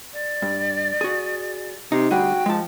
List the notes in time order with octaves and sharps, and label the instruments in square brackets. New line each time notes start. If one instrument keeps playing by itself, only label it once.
[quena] D5
[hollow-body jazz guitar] G2
F#4 G#4
[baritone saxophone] C3 [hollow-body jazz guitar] D#4
[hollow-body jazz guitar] D2 G3 G#4 [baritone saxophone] F#4 [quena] G5
[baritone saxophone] F3 [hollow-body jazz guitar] G#3 A5